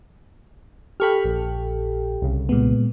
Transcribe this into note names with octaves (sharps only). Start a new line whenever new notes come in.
G4 A4 G5 B5 C#6 F6
A#1
C2 C#3
A#2 G#3 B3